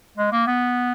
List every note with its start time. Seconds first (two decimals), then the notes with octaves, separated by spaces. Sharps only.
0.17 G#3
0.32 A#3
0.47 B3